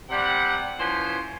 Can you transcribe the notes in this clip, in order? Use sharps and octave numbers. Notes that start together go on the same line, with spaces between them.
C3 G3 F#5
E3 F3 C#4 C5